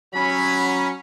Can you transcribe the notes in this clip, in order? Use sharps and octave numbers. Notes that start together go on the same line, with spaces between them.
F#3 C#4 B5